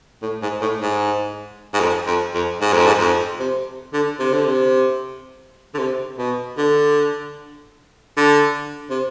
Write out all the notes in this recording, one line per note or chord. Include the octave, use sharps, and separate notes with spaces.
A2
G#2
A2
G#2
G#2
F2
F2
F2
G#2
F2
G#2
F2
C3
D3
C3
D3
C3
D3
C3
B2
D3
D3
C3